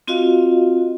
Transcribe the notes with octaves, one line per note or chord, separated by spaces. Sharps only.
C4 F4 F#4 D#5 F5